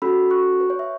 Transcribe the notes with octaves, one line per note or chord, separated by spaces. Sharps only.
C#4 F#4 A4 B5 E6
C#6 F#6
B4
C#5
E5